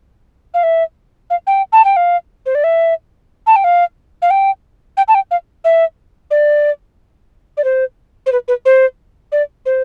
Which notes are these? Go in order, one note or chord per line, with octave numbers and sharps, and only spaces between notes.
F5
E5
F5
G5
A5
G5
F5
C5
D5
E5
A5
G5
F5
F5
G5
G5
A5
G5
F5
E5
D5
D5
C5
C5
B4
B4
C5
D5
C5